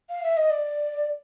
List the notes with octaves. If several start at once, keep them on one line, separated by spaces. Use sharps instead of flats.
F5
E5
D#5
D5